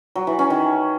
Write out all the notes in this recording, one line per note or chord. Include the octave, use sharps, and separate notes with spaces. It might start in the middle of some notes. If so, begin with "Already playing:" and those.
F#3
E3
C#4
D#3